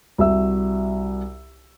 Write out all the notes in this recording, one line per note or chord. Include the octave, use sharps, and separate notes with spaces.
C2 F#4 E5 E6